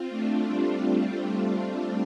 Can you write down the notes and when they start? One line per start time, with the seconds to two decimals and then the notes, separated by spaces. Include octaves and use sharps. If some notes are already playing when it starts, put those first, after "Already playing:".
Already playing: C4 F4
0.10 A3 D4
0.47 G3 C4